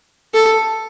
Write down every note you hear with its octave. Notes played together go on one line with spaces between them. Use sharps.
A4